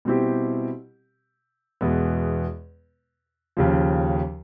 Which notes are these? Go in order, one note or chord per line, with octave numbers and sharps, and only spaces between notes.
B2 G3 C4 E4 G4
E2 B2 G#3 B3
D#2 C#3 F3